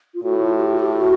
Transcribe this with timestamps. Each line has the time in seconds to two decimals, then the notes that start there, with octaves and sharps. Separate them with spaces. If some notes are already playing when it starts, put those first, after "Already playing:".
0.14 F4
0.23 A2 F#4
0.42 F4
0.57 F#4
0.60 G4
0.73 F#4
0.79 G4
0.98 F#4